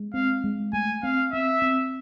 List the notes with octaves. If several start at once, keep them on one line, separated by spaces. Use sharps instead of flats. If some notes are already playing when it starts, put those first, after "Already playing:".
Already playing: G#3
C4 F5
G#3
A3 G#5
C4 F5
C4 E5
C4